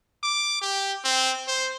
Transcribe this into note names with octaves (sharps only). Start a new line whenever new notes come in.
D6
G4
C4
C5